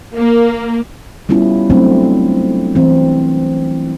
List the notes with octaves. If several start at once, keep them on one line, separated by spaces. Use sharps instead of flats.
A#3
G3 B3 C#4 E4 F4
F#3 A3 C4 D4
E3 C4